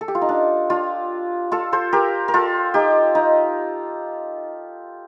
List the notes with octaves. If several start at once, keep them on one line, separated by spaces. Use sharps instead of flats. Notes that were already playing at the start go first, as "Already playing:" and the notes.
A4
G4
F4
D#4
D4
D4 F4
F4 A4
A4 C5
G4 A#4
A#4
F4 A4
D#4 G4
D#4